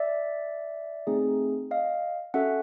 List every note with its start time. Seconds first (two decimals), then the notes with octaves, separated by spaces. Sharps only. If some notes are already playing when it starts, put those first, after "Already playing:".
Already playing: D5 E5
1.07 A3 C4 D#4 G#4
1.71 D#5 F5
2.34 C#4 F#4 A4 E5 F#5